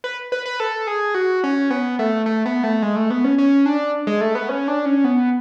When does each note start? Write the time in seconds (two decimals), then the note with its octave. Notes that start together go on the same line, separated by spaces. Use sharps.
0.04 B4
0.32 B4
0.46 B4
0.60 A4
0.87 G#4
1.15 F#4
1.44 C#4
1.70 B3
1.99 A3
2.26 A3
2.46 B3
2.64 A3
2.82 G#3
2.96 A3
3.11 B3
3.24 C#4
3.38 C#4
3.66 D4
4.07 G#3
4.21 A3
4.35 B3
4.49 C#4
4.68 D4
4.86 C#4
5.04 B3